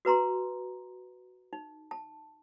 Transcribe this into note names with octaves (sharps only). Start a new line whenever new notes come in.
F#4 B4 A#5 C6
D#4
A5